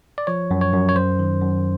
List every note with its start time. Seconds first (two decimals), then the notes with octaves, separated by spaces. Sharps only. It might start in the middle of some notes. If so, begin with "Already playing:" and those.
0.18 D5
0.27 F3 C#5
0.51 F#2
0.61 C#5
0.73 F#2
0.89 C#5
0.96 F#2 C5
1.19 D#3
1.41 F#2